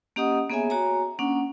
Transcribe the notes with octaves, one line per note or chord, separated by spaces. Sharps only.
A#3 C#4 G4 D#5 F#5 D#6
A#3 B3 G#4 C#5 E5 G#5
F#4 C#5 G#5 A#5
A#3 C#4 D4 F#5